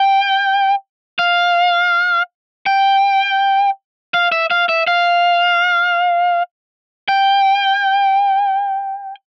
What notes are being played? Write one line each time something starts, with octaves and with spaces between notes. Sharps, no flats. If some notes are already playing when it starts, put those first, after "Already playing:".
Already playing: G5
F5
G5
F5
E5
F5
E5
F5
G5